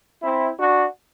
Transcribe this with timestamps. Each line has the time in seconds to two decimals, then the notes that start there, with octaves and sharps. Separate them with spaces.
0.23 C4 E4
0.59 D4 F#4